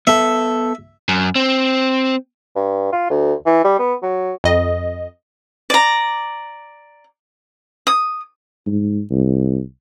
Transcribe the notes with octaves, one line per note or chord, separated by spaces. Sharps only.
B3 A4 E5
F#2
C4
G2
F4
D2
E3
G3
B3
F#3
F2 D#5
D5 A#5
D#6
G#2
C2